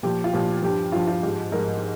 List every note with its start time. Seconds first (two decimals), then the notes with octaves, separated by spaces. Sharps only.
0.03 A#2 F3 G4
0.24 F4
0.33 A#2 F3 G4
0.62 G2 F3 G4
0.92 G2 F3 F4
1.07 F4
1.23 G#2 F3 G4
1.52 G#2 F3 A#4